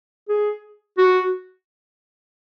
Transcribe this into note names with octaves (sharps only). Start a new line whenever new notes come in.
G#4
F#4